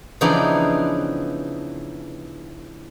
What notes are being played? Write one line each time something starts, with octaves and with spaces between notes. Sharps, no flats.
C#3 E3 F3 B3 D4 D#4